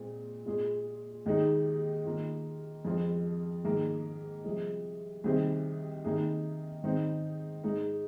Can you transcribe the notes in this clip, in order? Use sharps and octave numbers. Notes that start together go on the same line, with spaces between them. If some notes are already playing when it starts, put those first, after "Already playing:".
Already playing: A#2 G#3 C4
A#2 G#3 F4 G#4
D#2 D#3 G#3 D#4
D#3 A#3 F4
F2 F3 G#3 F4
G#2 D#3 A#3 G#4
C2 C3 F3 G#3
C2 C3 D#3 C4 G#4
C3 D#3 A#3 D#4 G#4
G#2 D#3 C4 D#4
G#2 G#3 D#4